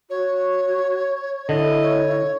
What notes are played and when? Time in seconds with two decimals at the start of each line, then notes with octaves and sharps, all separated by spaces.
0.10 F#4 C#5
1.49 D3 E4 D#5
1.82 C#5